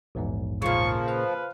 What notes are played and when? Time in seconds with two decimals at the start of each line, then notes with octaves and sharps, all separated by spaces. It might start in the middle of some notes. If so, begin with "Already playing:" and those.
0.15 A#1 E2 G#2
0.62 A#2 C#3 F3 C#6
1.07 B4 C5 F5 F6